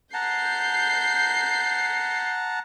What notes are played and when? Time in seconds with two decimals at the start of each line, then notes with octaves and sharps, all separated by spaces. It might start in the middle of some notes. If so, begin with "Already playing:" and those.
0.14 F#5 A5 A#5 G6 C7